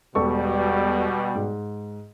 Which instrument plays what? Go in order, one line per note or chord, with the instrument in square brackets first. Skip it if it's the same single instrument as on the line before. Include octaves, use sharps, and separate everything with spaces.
[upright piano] E1 A4 C#6 [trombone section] B2 G3
[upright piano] G#2